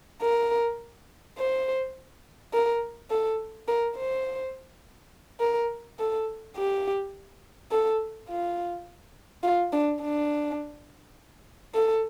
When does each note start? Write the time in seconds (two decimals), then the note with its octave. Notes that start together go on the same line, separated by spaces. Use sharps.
0.22 A#4
1.38 C5
2.53 A#4
3.10 A4
3.68 A#4
3.97 C5
5.40 A#4
5.99 A4
6.56 G4
7.71 A4
8.29 F4
9.44 F4
9.72 D4
10.02 D4
11.75 A4